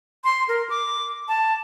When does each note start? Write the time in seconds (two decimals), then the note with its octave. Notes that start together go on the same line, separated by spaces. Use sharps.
0.24 C6
0.48 A#4
0.70 D6
1.28 A5